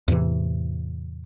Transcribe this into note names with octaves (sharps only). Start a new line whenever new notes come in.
E2 A2 C3 E3